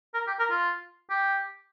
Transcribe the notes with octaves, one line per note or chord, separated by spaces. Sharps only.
A#4
G4
A#4
F4
G4